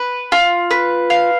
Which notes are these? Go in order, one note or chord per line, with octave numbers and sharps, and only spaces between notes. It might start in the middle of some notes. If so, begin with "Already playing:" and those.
Already playing: B4
F4
B4
F5